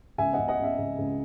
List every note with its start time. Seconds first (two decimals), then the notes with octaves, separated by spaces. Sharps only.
0.18 C#2 E5 G#5
0.33 C#2 D#5 F#5
0.48 D#5 F#5
0.59 C#3 E5
0.78 C#2
0.99 C#2